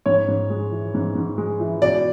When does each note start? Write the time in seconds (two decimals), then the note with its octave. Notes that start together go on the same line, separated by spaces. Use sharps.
0.06 G#2 C#5
0.28 G#2
0.50 G#3
0.71 E3
0.95 G#2
1.15 G#2
1.38 G#3
1.60 E3
1.82 B2 D5